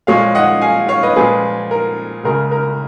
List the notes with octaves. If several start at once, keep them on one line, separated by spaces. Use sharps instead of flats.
A#2 F3 G#3 C#5 F5
D#5 F#5
F5 G#5
C#5 F5
B4 D#5
A#2 F3 G#3 G#4 B4
A#4
C#2 C#3 G#3 A#4
A#4